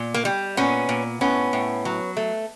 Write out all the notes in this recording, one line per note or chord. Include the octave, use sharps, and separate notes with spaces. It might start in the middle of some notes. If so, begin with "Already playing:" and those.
Already playing: A#2
A#3
G3
A#2 B3 C#4
A#2
A2 B3 C#4
A2
F#3
A3